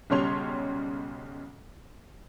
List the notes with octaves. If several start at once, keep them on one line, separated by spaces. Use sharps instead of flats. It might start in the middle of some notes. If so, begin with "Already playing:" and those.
B1 C#3 G3 C#5 C6 F7